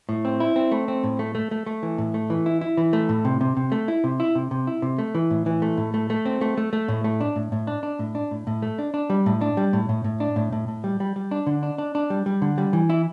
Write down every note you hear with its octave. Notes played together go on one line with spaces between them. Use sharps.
A2
C4
E4
C4
A3
C4
A2
A3
A3
A3
A3
E3
A2
A3
E3
E4
E4
E3
A3
A2
C3
C3
C3
A3
E4
C3
E4
C3
C3
E4
C3
A3
E3
A2
E3
A3
A2
A3
A3
C4
A3
A3
A3
A2
A3
D4
A2
A2
D4
D4
A2
D4
A2
A2
A3
D4
D4
G3
A2
D4
G3
A2
A2
A2
D4
A2
A2
A2
G3
G3
G3
D4
D3
D4
D4
D4
G3
G3
D3
G3
E3
E4